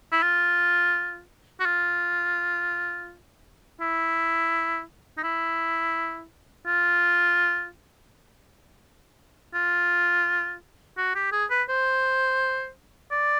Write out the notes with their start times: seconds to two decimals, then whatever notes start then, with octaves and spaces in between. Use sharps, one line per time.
0.12 E4
0.22 F4
1.60 F#4
1.65 F4
3.81 E4
5.17 D#4
5.23 E4
6.67 F4
9.54 F4
10.97 F#4
11.15 G4
11.32 G#4
11.50 B4
11.69 C5
13.11 D5